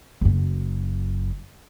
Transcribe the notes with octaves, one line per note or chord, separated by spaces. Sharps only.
F#1 F#2